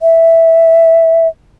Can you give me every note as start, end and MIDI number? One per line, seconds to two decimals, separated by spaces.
0.01 1.28 76